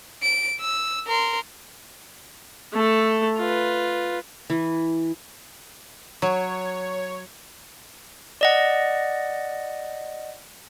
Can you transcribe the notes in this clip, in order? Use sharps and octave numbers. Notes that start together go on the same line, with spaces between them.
D7
E6
A#4 C6
A3 A4
F4 B4
E3
F#3 C#5
D5 D#5 F#5